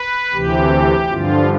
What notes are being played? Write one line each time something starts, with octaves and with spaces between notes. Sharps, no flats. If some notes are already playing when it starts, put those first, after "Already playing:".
Already playing: B4
D2 C3 E3 G4
G2 D3 F3 F4